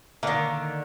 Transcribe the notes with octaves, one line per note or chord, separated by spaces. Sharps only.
D3 D#3 A#3